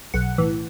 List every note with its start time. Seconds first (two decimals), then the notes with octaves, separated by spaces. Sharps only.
0.14 B1 F#5
0.38 A2 E3